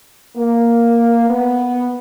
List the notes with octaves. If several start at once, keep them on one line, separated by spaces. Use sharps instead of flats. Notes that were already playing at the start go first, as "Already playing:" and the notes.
A#3
B3